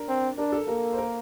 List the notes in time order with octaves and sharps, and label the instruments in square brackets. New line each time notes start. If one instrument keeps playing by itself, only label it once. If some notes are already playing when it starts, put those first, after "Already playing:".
Already playing: [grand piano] D4 A#4
[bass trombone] C4
[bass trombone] D4 [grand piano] A#4
[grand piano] A4
[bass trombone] A#3 [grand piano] A#4
[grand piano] C5
A#4